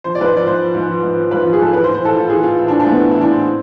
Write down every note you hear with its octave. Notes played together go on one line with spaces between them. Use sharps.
F3 C5
D5
G#2 B4
C5
F3 D5
G#2 C5
F3
G#2
F3
G#2
F3
G#2 B4
F4
F3
G#4
G#2 A4
E3 B4
C5
A2
C5
E3 A4
A2 F4
E3 G#4
A2 F4
E3 E4
D4
A2
D4
E3 A3 B3
A2
E4
E3
D4
A2 C4